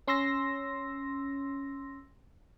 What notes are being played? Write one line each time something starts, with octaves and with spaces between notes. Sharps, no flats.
C#4 C6 E6 A#6